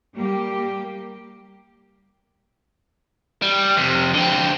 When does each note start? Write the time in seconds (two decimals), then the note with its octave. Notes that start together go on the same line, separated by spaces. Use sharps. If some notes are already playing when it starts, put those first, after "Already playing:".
0.14 G3 A#3 G4
3.42 G3
3.77 F2 C3
4.14 D3 C4